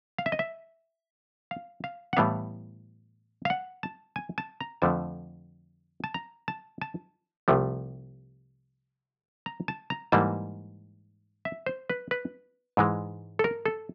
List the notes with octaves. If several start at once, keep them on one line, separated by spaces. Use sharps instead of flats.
F5
E5
D#5
E5
F5
F5
F#5
A2 E3 G3 B3 F5
F5
F#5
A5
G#5
A5
A#5
F2 D3 F3 A3 A5
A5
A#5
A5
A5
C2 C3 F3 A3
A#5
A5
A#5
G#2 E3 G3 A#3 A5
E5
C5
B4
B4
G#2 E3 G#3
A4
A#4
A4